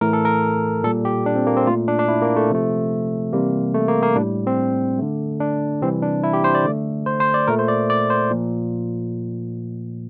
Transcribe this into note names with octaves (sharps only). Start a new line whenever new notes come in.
A2 E3 A3 A#4
A4
A#4
A#2 G3 A4
G4
D4
C4
A#3
C4
A#2 A3 F4
D4
D4
E4
A#3
A3
C3 F3 A3
C3 E3 G3 A#3
A3
A#3
A#3
A2 G3 D4
C4
D3 A3
D4
C3 E3 G3 C4
D4
E4
G4
C5
D5
D3 A3
C5
C5
D5
A#2 A3 A#4
C5
D5
D5
C5
A#2 F3